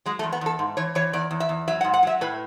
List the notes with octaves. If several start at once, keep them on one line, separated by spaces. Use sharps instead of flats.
F#3 G#3
A3
E2
B3
E2 A4
G#2
E3 C#5
E3 C#5
E2 D5
E2
E5
E2
F#3 E5
F#5
G#2
F#5
F#3 E5
A2 B4